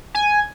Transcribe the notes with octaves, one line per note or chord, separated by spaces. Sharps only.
G#5